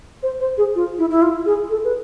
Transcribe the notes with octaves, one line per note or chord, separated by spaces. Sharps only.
C5
C5
G#4
F4
E4
E4
F4
G#4
A4
B4